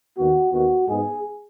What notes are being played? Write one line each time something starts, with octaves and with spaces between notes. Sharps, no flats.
D#2 D#3 B3 F#4
D#2 D#3 B3 F#4
G#2 G#3 B3 G#4